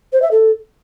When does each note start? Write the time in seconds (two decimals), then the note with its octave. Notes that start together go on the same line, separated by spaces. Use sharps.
0.13 C5
0.22 E5
0.31 A4